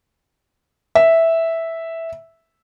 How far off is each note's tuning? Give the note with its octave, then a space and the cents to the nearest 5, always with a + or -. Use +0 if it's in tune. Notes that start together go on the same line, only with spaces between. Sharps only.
E5 -5